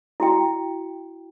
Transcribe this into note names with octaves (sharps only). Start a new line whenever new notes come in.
E4 F#4 G5